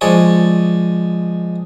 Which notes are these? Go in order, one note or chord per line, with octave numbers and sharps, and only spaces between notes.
F3 G#3 D5 G#5 C#6